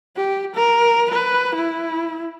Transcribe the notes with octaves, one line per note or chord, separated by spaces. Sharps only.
G4
A#4
B4
E4